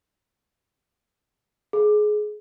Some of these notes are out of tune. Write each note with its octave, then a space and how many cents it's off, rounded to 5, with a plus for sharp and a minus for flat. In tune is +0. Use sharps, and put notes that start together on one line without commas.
G#4 +20